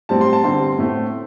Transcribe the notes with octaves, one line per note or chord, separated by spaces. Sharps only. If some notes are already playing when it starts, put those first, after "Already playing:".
A2 G3 C4 A5
C6
A5
G2 D3 G3 C4 C6
A2 A3 C4